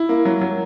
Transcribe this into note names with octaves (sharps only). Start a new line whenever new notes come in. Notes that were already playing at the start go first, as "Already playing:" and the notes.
Already playing: E4
A#3
F#3
F#3